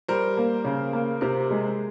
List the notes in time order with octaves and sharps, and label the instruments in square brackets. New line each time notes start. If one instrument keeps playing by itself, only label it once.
[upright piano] G3 [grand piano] A#4 C5
[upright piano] A#3
C#3
A#3
[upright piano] C3 [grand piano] A#4 C5
[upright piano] G#3